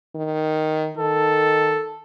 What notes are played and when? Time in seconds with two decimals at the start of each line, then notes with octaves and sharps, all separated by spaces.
0.15 D#3
0.97 D#3 A4